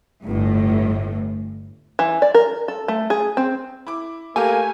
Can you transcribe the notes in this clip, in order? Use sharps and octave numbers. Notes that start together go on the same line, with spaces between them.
G1 A2
E3
D5
A#4
A4
A3
G#4
C4
E4 D6
A3 A#3 G4 A4 G#5